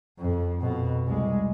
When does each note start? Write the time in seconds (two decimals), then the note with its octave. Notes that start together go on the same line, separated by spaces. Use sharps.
0.19 F2
0.60 F2 B2
1.07 C2 G#3